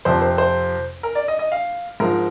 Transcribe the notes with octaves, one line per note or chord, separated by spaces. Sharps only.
F2 C3 F3 C5
C5
C5
A#4
D5
D#5
D#5
F5
G#2 F3 A#4